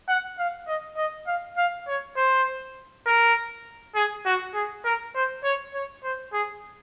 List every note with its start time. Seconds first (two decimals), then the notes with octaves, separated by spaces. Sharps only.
0.08 F#5
0.39 F5
0.68 D#5
0.97 D#5
1.27 F5
1.57 F5
1.88 C#5
2.17 C5
3.06 A#4
3.95 G#4
4.25 F#4
4.54 G#4
4.85 A#4
5.15 C5
5.44 C#5
5.74 C#5
6.04 C5
6.33 G#4